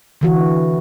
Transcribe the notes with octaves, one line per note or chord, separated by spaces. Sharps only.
D3 E3 F#4